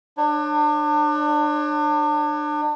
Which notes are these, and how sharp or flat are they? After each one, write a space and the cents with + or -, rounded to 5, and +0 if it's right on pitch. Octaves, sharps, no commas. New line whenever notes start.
D4 +35 C#5 -10